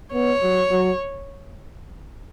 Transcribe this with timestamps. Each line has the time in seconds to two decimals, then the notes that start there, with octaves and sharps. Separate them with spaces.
0.14 B3 C#5
0.43 F#3
0.71 F#3